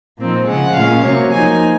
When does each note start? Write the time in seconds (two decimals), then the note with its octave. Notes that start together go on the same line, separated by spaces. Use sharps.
0.19 A#2 F3 C4 D#4
0.47 C#3 F3 G#3 F#5
0.76 A#2 G#3 C#4 F5
1.04 C3 F#3 A#3 C#5
1.33 F3 A#3 D#4 G#5